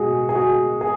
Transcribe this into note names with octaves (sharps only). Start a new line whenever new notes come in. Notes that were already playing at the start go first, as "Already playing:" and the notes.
Already playing: B2 G#3 F#4 G#4
G#4
F#4
G#4